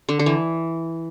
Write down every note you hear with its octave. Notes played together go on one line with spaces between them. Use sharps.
D3
D3
E3